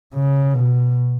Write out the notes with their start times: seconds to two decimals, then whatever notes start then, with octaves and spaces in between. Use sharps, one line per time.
0.15 C#3
0.54 B2